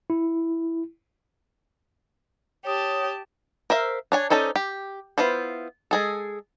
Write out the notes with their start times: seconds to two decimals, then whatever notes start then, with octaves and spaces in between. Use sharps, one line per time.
0.10 E4
2.65 G4 C#5 A5 D#6
3.70 A#4 C5 E5 F5
4.12 D4 C#5 G#5
4.30 C#4 D#4 A4 C5 D5
4.56 G4
5.18 B3 E4 F4 C5
5.91 G#3 G#4 A4